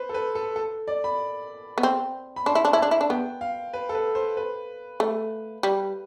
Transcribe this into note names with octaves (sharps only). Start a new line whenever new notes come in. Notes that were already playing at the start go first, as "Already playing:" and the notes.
Already playing: B4 C5
A4
B4
A4
A4
D5
B5
B3
C4
B5
D4 C6
E4
D4
E4
A5
D4
E4
D4
B3 G5
F5
B4
A4
B4
C5
B4
A3
G3